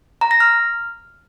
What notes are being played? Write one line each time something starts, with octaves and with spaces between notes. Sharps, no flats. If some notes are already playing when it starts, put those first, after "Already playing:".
A#5
A#6
F6